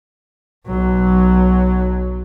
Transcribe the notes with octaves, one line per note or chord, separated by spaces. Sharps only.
B1 F#3